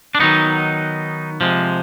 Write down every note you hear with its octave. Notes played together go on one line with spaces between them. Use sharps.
D4
D#3 F#3 B3 D#4
C3 F3 G#3